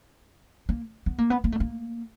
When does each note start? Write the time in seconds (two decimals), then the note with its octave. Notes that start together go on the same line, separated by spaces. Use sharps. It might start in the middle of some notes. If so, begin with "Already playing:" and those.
0.69 A#3
1.06 B3
1.18 A#3
1.30 B3
1.44 A#3
1.52 A3
1.60 A#3